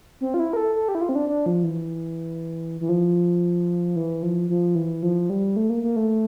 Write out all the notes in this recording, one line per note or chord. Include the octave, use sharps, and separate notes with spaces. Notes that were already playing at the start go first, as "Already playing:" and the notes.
C4
F4
E4
A#4
A4
A4
G4
E4
F4
C4
D4
D4
F3
E3
E3
F3
E3
F3
F3
E3
F3
G3
A3
A#3
A#3
A3